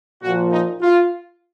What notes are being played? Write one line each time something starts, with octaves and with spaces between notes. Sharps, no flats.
A#2 F3 F#4
D#4
F4